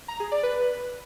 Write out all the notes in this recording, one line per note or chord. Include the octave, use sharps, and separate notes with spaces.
A#5
G#4
D5
B4